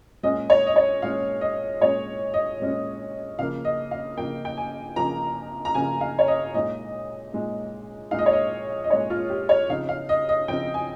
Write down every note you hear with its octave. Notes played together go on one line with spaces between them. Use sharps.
A#2 G#3 C#4 D#5
C#5
D#5
C#5
A#2 G#3 C#4 F5
D#5
A#2 G#3 C#4 C#5
D#5
A#2 G#3 C#4
C#3 F3 A#3 F5
D#5
F5
C#3 F3 A#3 G5
G5
G#5
C#3 F3 A#3 A#5
A#5
C#3 F3 A#3 G#5
F5
C#5
D#5
A#2 G#3 D#4 D#5
A#2 G#3 D#4
A#2 G#3 D#4 F5
D#5
C#5
D#5
D#5
A#2 G#3 D#4 C#5
F4
G4
C#5
C#3 F3 C4 D#4 F5
F5
D#5
D#5
C#3 F3 C4 D#4 G5
G#5